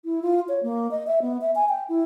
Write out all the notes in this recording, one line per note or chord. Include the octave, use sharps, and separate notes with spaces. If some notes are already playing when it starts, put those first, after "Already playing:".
E4
F4
C#5
A#3
D#5
E5
B3
E5
G#5
G5
E4